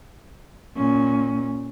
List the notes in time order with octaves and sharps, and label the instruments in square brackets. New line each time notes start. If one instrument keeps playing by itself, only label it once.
[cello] A#2 C#4